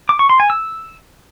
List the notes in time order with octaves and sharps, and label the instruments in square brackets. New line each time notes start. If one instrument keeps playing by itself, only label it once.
[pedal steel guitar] D6
C#6
C6
G#5
E6